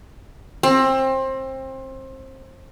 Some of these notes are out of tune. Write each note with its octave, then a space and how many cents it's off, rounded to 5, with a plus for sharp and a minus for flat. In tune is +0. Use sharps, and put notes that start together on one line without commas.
C4 +25